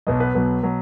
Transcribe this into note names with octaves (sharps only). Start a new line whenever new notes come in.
B1 B2 F#3 D#5
B4
B1 B2 F#3
B2 F#3